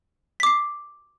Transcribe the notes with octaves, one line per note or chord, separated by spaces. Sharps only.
D6 B6 C7